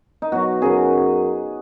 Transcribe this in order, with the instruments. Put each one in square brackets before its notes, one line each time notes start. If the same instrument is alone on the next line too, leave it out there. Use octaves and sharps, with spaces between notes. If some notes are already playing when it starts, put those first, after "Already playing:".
[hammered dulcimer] D#4
B2 F#3 F#4
F#2 C#3 F#3 G#4